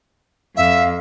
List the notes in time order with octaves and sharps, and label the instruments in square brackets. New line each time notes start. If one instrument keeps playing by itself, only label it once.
[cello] F2 [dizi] E5 [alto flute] F5